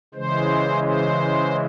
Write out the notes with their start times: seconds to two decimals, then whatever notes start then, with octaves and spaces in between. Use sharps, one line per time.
0.14 C#3 E3 G#3 C5
0.83 C5